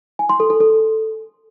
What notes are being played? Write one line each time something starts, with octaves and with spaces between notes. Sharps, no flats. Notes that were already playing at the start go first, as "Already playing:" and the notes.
G#5
C6
A4
A4
A4